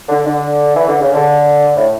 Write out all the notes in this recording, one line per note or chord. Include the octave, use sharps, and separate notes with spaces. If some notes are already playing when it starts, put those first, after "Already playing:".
D3
D3
E3
D3
C#3
D3
A2